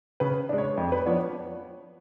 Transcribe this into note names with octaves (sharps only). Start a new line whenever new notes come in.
C#3 B4
G#3 D4
C#5
F2
B4
F3 B3 D4 C#5